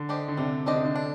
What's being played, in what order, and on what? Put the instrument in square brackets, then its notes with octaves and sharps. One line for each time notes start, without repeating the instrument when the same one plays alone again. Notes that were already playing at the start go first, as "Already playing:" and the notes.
Already playing: [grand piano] D3
[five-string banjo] D4 G4 C5 D#5
[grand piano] D3
[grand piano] C3 [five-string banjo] G3
[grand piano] D3 [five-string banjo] D4 G4 C5 D#5
[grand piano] C3
D3
[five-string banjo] D4